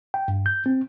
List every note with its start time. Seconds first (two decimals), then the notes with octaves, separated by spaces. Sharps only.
0.14 G5
0.28 G2
0.46 G6
0.66 C4